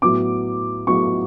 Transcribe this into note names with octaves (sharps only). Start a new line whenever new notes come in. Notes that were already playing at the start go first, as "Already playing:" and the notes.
A2 F#3 B3 D6
A2 F#3 B3 C#6